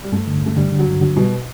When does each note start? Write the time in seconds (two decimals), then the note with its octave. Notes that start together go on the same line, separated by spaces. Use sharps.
0.03 G3
0.12 G2 A3
0.27 D3
0.42 G2 A3
0.57 D3 G3
0.72 D3
0.79 F#3
0.87 G2
1.01 D3 F#3
1.16 B2 G3